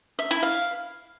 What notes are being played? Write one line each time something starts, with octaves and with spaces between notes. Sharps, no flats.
E5
E4
F5